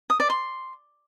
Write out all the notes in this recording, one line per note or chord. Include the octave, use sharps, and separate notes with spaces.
D#6
D5
C6